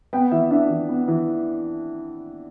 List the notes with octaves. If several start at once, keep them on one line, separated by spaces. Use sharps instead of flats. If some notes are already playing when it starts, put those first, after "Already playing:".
B3 G5
E3 E5
D4 E5
E3
B3
E3